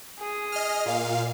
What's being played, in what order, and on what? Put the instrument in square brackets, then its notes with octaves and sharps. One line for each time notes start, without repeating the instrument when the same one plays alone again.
[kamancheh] G#4
[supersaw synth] D#5 F6
A#2 F5